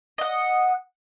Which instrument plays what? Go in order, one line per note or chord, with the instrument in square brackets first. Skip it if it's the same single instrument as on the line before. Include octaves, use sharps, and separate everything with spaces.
[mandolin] D#5 F#5